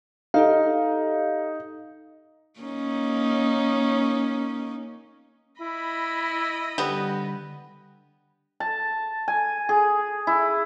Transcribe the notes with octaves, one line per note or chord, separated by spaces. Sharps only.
D#4 G4 A4 F5
A#3 C#4 D#4
E4 D#5 B5
D3 G3 B3 G5
A5
G#5
G#4
E4